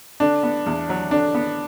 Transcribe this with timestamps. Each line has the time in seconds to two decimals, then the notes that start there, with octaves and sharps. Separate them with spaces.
0.20 D3 D4
0.43 B3
0.66 E2
0.89 F#3
1.11 D3 D4
1.34 B3